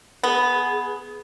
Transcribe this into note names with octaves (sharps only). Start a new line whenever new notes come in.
B3 G#4